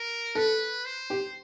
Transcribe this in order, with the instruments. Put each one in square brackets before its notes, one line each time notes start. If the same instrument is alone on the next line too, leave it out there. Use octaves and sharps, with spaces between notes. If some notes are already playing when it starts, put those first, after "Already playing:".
Already playing: [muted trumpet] A#4
[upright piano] A4 [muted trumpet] B4
[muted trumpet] C5
[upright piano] G4